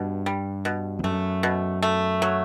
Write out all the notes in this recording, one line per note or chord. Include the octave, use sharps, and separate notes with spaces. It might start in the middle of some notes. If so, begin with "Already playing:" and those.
Already playing: G2 B2
G3
B2
E2
F#2 A3
B2
A3
F#3